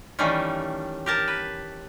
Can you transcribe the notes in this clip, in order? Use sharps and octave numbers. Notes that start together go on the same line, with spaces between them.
D#3 E3 G3 A3 C#4
G4 A#4 A5
B4